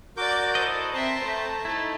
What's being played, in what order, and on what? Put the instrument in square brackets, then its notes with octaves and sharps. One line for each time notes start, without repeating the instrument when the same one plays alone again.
[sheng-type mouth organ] F#4 A#4 G6 [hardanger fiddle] D5 D6
[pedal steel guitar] E4 A4 D#5 [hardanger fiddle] C5
[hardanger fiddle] C4 E5 [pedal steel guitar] C5 [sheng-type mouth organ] A5 A#5
[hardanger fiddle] A3
[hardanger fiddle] A3 D#4 [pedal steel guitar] E4